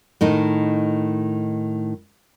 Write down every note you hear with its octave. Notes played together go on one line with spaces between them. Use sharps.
A2 D#3 D#4